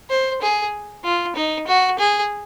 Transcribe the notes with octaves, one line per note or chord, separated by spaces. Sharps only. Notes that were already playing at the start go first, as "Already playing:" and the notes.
C5
G#4
F4
D#4
F#4
G#4